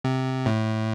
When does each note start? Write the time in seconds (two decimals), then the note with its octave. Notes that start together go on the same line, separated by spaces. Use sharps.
0.04 C3
0.46 A2